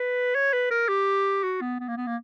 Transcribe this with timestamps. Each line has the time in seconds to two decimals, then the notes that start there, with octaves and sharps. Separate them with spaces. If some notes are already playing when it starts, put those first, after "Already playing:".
Already playing: B4
0.35 C#5
0.53 B4
0.71 A#4
0.89 G4
1.43 F#4
1.61 B3
1.80 B3
1.88 A#3
1.97 B3
2.07 A#3